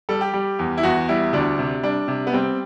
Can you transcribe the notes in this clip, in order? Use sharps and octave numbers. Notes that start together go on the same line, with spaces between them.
G3 A4
G4
G3
E2
E4
E2 F#4
G3 E4
D2 D4
C3
G3 D4
C3
B3
G3 C4